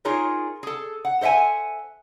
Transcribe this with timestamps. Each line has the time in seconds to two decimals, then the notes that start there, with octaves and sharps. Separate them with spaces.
0.05 D#4 F4 G#4 A#4 C#5
0.63 G#4 A4
1.05 F#5
1.21 A4 C5 E5 F#5 G#5